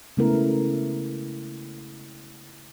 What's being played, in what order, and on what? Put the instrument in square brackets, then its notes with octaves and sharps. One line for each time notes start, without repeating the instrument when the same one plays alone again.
[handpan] C#3 G#3 A3 B3 E4 A#4